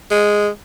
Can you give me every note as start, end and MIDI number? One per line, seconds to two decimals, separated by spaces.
0.11 0.48 56